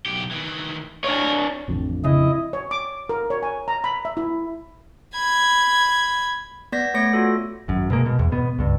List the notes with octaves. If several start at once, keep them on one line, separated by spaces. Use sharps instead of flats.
B1 G4
D#3 E3
D4 F4 A#4 C#5
A1 F2 D3
C#3 E4 D#5
C#5
D6
A#4
C#5
G#5
A#5
B5
E5
E4
B5 G#6
B3 D5 G6 A#6 B6
A3 B3 C#5 D6 A#6 C#7
F4 F#4 A4
G#1 F#2
B2 G#3 A#3
B2
E2
G#2 B2 B3
C#2 G2